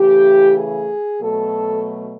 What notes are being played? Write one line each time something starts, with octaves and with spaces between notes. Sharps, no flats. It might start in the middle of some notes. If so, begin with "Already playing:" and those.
Already playing: C#3 E3 A3 G4
G#4
B2 F#3 A3 A4